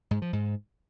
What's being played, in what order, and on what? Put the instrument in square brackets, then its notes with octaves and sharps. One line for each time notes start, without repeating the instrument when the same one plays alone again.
[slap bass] G#2
F3
G#2